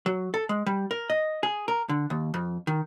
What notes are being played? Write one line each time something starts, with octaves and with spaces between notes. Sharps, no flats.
F#3
A4
G#3
G3
A#4
D#5
G#4
A#4
D3
D#2
F2
D#3